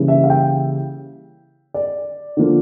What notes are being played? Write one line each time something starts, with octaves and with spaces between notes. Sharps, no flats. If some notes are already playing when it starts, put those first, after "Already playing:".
Already playing: C#3 E3 G3 A#3
E5
F5
G5
D5
D3 F3 A#3